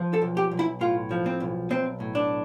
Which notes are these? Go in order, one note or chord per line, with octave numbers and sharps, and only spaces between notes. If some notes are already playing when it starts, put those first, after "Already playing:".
Already playing: F3
A4
B1
G4
B1
E4
A2 F4
F3
C4
B1
B1 C4
A2
D4